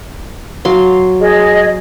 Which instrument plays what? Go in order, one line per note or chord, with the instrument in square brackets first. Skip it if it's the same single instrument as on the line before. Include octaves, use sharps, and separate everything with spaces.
[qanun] F#3 F5 C6
[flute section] G#4 D#5